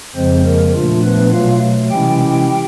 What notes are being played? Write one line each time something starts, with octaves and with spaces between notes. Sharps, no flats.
F2 C#3 F3 G#3 C4 C5
A#3 A#4
A#2 F3 A3 D4 F4
B3 B4
B2 F#3 A3 F4 F5
C3 E3 G#3 C#4 E4 G4 G5